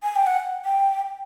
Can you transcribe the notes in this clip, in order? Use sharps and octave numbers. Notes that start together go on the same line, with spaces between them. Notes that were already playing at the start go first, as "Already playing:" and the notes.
G#5
G5
F#5
G5